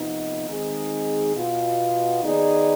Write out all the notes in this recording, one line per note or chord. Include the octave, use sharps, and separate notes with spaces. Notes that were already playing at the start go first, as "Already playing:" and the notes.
Already playing: C3 F3 B3 D#4
D#3 G#3 C4 D#4 G#4
B2 B3 F4
D#3 B3 D#4 G#4 D5